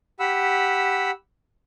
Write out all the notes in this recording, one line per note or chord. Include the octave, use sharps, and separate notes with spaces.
G4 F#5 B5 E6